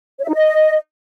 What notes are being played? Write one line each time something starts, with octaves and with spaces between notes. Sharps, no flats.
C#5
E5
D#4
D#5